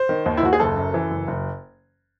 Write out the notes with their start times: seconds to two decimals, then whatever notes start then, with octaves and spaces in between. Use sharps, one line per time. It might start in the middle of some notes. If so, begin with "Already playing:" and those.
Already playing: C5
0.09 D#3
0.26 D#2
0.37 E4
0.43 D#2 F#4
0.53 G#4
0.60 F#1 A4
0.77 F#2
0.94 E3
1.11 F#1
1.28 F#1